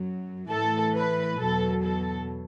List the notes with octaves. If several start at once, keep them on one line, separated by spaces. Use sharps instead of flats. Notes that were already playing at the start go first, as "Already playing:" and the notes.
Already playing: F#2 F#3
A2 E3 A4
B4
E2 B2 F#3 A4
A4